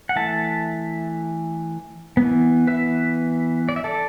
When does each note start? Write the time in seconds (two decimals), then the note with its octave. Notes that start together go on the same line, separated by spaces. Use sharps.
0.09 F#5
0.16 E3 A3 E5 A5
2.17 B3
2.22 E3
2.67 B4 E5
3.69 D5
3.76 E5
3.84 A4 D5